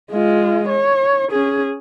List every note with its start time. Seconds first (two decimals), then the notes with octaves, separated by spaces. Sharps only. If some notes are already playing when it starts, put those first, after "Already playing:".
0.12 G#3 F4
0.69 C#5
1.31 C#4 G#4